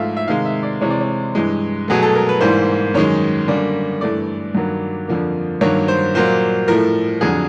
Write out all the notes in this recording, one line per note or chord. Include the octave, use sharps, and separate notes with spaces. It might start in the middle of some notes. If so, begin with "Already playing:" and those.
Already playing: G#2 F3 A3 E5 F5
E5
C3 D#3 G#3 F5
E5
D5
C3 E3 G#3 C#5
D5
C#5
G2 E3 G#3
B2 F#3 A3 G#4
A4
A#4
B4
G#2 E3 G3 A#3 C5
F#2 D#3 G#3 C#5
F#2 D3 G3 A#3
G2 E3 A3 D5
G2 D#3 F#3 A#3
F2 D3 F3 A#3
G2 D#3 F#3 A#3 C#5
C5
A#2 F#3 A#3 C5
A2 F3 A3 A#4
F2 D3 F#3 G#4